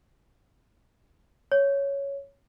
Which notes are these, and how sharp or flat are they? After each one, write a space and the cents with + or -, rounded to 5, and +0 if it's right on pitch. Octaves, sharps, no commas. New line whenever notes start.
C#5 +5